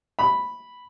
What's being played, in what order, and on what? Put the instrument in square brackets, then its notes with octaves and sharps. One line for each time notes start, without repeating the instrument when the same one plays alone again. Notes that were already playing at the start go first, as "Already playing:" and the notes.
[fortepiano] B5